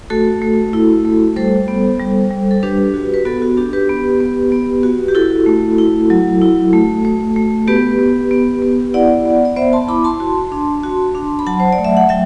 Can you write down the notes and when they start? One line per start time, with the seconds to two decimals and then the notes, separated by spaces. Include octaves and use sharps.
0.10 A3 F#4 A4
0.42 A3
0.73 E4
1.05 A3
1.36 G3 A4 C5
1.68 B3
2.00 G3
2.31 G3
2.51 A4
2.63 D4 G4 B4
2.94 F#4
3.14 B4
3.25 B3 F#4 A4
3.42 F#4
3.57 D4 G4
3.73 G4 B4
3.89 B3
4.20 B3
4.52 B3
4.83 F#4
5.08 G4
5.15 E4 F#4 A4
5.46 A3
5.78 E4
6.10 F#3
6.42 E4
6.73 A3
7.05 A3
7.36 A3
7.68 B3 G4 B4
7.99 B3
8.31 B3
8.62 B3
8.94 E4 D5 F#5
9.25 B3
9.45 D5
9.56 B3 C5 E5
9.73 A5 C6
9.88 E4 B5 D6
10.04 A5 C6
10.20 F#4
10.52 D4
10.83 F#4
11.15 D4
11.39 B5
11.46 F#3 F#5 A5
11.60 C5
11.73 D5
11.78 A3
11.85 E5
11.97 F#5
12.09 F#3 E5 G5